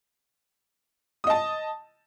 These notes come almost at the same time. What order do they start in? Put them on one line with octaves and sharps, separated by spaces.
D#6 D#5 A5